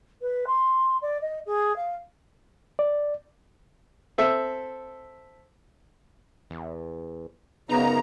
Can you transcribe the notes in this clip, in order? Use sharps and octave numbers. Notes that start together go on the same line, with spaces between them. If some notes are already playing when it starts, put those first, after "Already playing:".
B4
C6
D5
D#5
G#4
F5
D5
C4 A4 E5
E2
F#2 C#3 B3 D#4 A#5